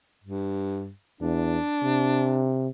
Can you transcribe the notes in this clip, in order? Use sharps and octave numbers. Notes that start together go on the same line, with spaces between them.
G2
E2 D4
C3